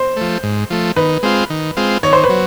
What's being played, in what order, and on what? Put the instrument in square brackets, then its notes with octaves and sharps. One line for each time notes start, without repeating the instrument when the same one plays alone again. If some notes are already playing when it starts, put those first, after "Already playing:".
Already playing: [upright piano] C5
[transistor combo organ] F3 A3
G#2
F3 A3
[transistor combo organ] D#3 [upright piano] B4
[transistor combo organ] G#3 C4 F4
D#3
G#3 C4 F4
[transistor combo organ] D#3 [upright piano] C#5
[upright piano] C5
B4
[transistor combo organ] F#3